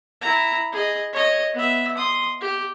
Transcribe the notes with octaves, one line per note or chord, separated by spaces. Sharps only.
E4 A#5
G#4 D#5
C#5 D#5
B3 E5
C6 D#6
G4